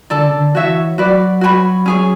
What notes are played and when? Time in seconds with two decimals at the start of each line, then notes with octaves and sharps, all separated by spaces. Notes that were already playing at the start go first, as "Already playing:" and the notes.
0.10 D3 A4 D5 A5
0.28 C#3
0.33 D3
0.54 E3 F#4 C#5 E5
0.98 F#3 F#4 B4 D5
1.41 F#4 C#5 G#5 B5
1.86 C#4 G#4 C#5